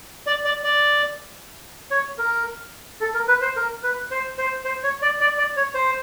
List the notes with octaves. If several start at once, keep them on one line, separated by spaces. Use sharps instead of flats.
D5
D5
D5
C#5
A#4
A4
A#4
B4
C5
A#4
B4
C5
C5
C5
C#5
D5
D5
D5
C#5
C5